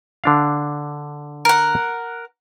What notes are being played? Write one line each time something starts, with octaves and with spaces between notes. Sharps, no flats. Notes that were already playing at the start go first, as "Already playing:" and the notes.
D3 D4 F5
A#4 F#5